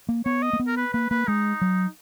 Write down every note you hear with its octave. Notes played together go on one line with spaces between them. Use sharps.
A#3
B3 C#5
D#5
A#3
B3
A#4
B4
A#3 B4
A#3 B4
G#3 D#4
F#3